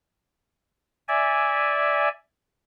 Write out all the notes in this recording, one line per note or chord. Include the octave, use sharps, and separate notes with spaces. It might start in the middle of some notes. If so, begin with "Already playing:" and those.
D5 E5 G#5